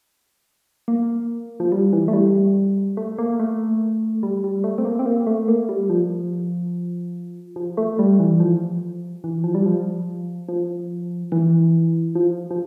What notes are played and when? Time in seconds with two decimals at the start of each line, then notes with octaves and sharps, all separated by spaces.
0.88 A#3
1.60 F3
1.72 G3
1.93 E3
2.08 A3
2.13 G3
2.97 A3
3.18 A#3
3.40 A3
4.23 G3
4.44 G3
4.64 A3
4.78 C4
4.85 A#3
4.99 C4
5.06 A#3
5.27 A3
5.48 A#3
5.69 G3
5.89 F3
7.56 F3
7.77 A3
7.99 G3
8.19 E3
8.40 F3
9.24 E3
9.44 F3
9.55 G3
9.66 F3
10.48 F3
11.32 E3
12.15 F3
12.51 F3